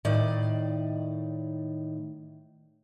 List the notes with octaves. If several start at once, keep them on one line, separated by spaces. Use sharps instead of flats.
A2 D#3 D5 D#5